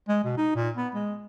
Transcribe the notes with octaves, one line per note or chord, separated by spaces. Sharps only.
G#3
B2
D#4
A#2
B3
G#3